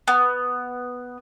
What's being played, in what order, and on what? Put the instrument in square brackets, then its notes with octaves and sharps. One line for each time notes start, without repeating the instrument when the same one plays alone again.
[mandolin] B3